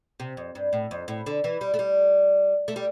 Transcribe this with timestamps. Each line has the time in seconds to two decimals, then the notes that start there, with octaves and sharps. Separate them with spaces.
0.20 C3
0.37 F2
0.55 G2
0.73 A2
0.91 F2
1.08 A2
1.26 D3
1.44 E3
1.61 G3
1.74 A3
1.79 G3
2.68 A3
2.76 G3